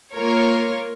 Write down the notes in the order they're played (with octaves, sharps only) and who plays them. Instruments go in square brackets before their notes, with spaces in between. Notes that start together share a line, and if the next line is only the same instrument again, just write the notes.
[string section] A#3 F4 A#4 C#5